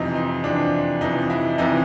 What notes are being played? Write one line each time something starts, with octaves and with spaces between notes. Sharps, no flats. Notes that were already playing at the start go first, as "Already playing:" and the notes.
Already playing: F2 C3 E3 D#4
D#4
F2 C3 E3 D4
F2 C3 E3 D#4
E4
F2 C3 E3 D#4